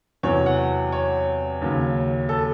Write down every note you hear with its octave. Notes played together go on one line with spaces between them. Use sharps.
E2 C3 F#3 C#5
F#5
C#5
D#2 C#3 F#3
A4